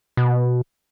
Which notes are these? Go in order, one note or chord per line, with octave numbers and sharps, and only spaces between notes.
B2